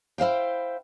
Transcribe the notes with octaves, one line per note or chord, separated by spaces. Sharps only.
E4 C5 F5 G5